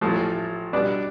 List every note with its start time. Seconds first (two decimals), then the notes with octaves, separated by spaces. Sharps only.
0.01 A1 A2 F3 A3
0.73 B2 G3 B3 D4